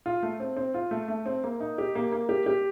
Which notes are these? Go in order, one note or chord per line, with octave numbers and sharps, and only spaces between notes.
F4
A3
C4
C4
F4
A3
A3
C4
A#3
D#4
G4
A#3
A#3
G4
G4